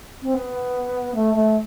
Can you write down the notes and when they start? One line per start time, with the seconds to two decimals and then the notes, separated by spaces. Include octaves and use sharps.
0.22 C4
0.34 B3
1.14 A3
1.34 A3